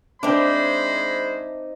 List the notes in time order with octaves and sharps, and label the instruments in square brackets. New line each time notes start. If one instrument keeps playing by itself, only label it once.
[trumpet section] G#3 C5 B5 [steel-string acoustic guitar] C4 D#4 [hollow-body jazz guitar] D4 [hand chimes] E5 D6